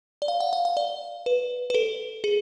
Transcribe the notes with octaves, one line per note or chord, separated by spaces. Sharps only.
D5
F5
F#5
F5
F5
D5
B4
B4
A4
G#4